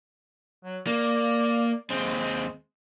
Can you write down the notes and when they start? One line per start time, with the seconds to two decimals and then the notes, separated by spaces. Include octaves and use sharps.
0.65 F#3
0.87 A#3 D5
1.90 D#2 G#3 C4